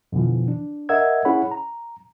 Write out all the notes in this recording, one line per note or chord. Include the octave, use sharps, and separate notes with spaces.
F2 B2 D3 E3 F3
D4
A#4 D#5 E5 F#5 E6 G#6
C#4 E4 G#4 C#5 F#5 B5
A#5